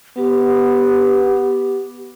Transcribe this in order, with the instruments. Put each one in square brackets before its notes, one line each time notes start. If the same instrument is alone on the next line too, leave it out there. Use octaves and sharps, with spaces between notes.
[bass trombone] B3 [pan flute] G4